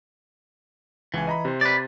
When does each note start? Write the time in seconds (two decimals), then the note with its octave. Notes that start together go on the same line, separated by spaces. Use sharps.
1.14 C#2 E3 G#5
1.27 D#5 A#5 B5
1.45 C3 C5
1.61 B4 D5